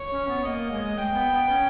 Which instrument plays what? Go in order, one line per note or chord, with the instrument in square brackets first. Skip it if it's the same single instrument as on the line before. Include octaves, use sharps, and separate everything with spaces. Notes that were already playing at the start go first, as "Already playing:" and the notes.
Already playing: [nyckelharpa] C#5
[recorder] C#4
B3
[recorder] A#3 [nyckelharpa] D#5
[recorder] G#3
[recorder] G#3 [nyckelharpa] G5
[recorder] B3
B3
C#4